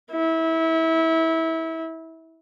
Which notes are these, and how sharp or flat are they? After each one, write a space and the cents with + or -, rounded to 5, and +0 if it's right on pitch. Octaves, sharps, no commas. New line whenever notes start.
E4 -25